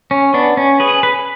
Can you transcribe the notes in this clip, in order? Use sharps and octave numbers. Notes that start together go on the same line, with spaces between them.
C#4
B3 D4
C#4
G#4 B4
B4